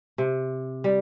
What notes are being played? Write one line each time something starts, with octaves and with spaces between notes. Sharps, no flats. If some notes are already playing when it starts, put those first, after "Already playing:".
C3
G3